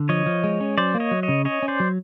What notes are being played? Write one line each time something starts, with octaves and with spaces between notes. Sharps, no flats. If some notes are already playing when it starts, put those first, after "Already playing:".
Already playing: D3
F3 C#5 D#5
F3
G#3
C#4
F#3 C5 D5
A#3
C#5 D#5
F#3
C#5 D#5
C#3
C#4 C#5 D#5
C#4
C5 D5
F#3